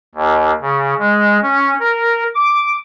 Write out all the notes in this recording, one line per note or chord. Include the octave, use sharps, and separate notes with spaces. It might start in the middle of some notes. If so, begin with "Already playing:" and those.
D#2
C#3
G#3
C#4
A#4
D6